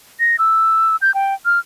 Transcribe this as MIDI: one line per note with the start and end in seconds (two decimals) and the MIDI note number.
0.20 0.36 94
0.39 0.96 88
1.02 1.14 91
1.14 1.34 79
1.45 1.59 89